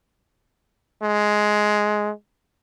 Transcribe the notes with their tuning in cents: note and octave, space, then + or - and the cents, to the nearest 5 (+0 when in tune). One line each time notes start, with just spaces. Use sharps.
G#3 +10